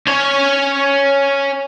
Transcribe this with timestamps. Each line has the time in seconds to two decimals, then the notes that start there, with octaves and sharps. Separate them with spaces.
0.07 C#4 C#5